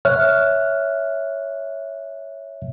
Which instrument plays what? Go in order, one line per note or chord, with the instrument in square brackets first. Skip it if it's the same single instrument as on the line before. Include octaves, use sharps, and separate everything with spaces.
[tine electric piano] C#5 E5 F6 F#6